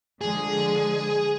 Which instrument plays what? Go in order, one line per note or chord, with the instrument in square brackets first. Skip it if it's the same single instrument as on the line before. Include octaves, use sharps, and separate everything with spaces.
[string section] D3 F3 G#3 [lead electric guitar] G#4